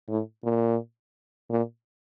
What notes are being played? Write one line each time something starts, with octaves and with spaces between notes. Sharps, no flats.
A2
A#2
A#2